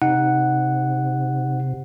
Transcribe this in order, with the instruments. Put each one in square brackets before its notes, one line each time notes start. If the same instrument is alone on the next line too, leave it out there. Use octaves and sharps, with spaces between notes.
[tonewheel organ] C3 [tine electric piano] D#4 F#5